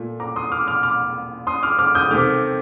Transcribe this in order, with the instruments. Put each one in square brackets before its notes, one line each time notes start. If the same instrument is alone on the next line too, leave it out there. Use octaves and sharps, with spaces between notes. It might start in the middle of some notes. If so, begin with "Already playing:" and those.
Already playing: [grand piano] A#2 A3
A#5 D6
C6 D#6
D6 F6
D6 F6
D6 F6
C6 D#6
D6 F6
D6 F6
D#6 G6
C3 D#3 A3 D6 F6